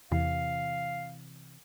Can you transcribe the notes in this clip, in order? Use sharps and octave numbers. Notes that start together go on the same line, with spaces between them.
E2 C3 E3 F5